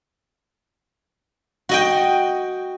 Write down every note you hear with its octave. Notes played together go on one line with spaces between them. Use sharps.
F#4 D#5 G5